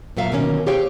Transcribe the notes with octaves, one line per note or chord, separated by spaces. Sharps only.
A#2 F#3 A#3 A4 E5 F5
B2 D3 D#3 A#3 C#4
G4 G#4 C5 C#5 F5 G5